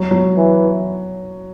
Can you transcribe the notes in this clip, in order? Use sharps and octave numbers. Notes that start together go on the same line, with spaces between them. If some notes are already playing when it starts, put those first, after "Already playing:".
Already playing: F#3
F#3
E3